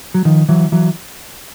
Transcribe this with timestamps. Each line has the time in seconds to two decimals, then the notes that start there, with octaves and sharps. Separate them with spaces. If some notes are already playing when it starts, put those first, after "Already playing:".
0.14 F#3
0.25 D#3 F3
0.49 E3 F#3
0.72 E3 F#3